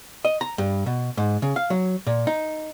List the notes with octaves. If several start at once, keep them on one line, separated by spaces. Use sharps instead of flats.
D#5
A#5
G2
B2
G#2
C#3
F5
F#3
A#2
D#4